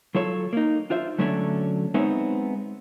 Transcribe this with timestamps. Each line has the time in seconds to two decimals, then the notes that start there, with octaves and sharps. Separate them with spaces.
0.15 F#3 F4 A4 C#5
0.53 A#3 D#4
0.90 D4 F4 C5 E5
1.18 D3 F#3 A3 C#4 D4 C#5
1.94 G#3 B3 C4 D#4 C#5 E5